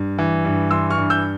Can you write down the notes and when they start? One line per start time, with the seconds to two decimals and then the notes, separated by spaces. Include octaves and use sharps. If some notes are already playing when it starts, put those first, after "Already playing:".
Already playing: G2
0.19 E3
0.45 G2
0.71 E3 C6 E6
0.90 C#6 F6
0.98 G2
1.10 E6 G6